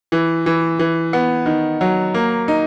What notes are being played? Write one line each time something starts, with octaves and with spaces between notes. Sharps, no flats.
E3
E3
E3
B3
D#3
F#3
A#3
D#4